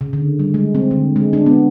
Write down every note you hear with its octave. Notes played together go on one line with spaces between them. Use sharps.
C#3
D3
G3
G#3
C4
D3
G#3
D4
B3